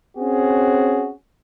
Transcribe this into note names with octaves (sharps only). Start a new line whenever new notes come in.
C4 C#4 F#4 G#4